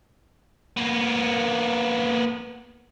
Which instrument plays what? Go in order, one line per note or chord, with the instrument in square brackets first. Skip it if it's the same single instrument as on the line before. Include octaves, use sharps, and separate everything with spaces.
[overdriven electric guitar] A#3 B3